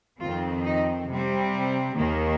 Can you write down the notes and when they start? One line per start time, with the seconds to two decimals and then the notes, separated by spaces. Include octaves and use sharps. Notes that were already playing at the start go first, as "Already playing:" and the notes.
0.21 F2 D#3 C4 F4
0.65 D#4
1.09 C3 G3 C4
1.97 D#2 D#3 A#3